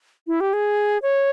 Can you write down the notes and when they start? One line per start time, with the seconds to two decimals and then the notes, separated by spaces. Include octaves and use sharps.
0.27 E4
0.40 G4
0.53 G#4
1.02 C#5